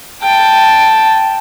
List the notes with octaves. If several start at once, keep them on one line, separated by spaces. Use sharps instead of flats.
G5 A5